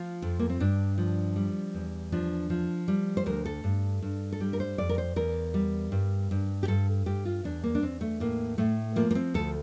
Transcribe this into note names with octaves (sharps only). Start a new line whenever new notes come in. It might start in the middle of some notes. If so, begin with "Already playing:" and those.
Already playing: F3 F4
F2
A#3
C4
G2 D4
F3
G3
E2
F3 D4
F3
G3
C5
D2 A#4
A4
G2
G2
A4
G3 G4
A#4
C5
F2 D5
A#4
C5
E2 A#4
G3
G2
G2
G4
G2 A4
G2 G4
F4
E2 D4
A#3
D4
E2 C4
A3
A2 A#3
A2 A3
F3 A#3
A#3
C4
D2 A4